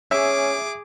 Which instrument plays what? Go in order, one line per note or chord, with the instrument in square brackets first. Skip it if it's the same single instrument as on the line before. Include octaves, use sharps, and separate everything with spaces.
[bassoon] C#4 [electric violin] G#4 D6 [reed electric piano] E5